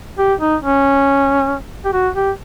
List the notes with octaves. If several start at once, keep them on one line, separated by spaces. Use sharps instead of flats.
G4
D#4
C#4
G4
F#4
G4